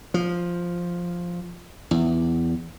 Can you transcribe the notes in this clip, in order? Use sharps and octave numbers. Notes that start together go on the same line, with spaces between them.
F3
E2